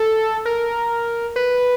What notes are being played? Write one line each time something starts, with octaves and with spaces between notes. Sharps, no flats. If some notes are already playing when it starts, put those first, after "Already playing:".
Already playing: A4
A#4
B4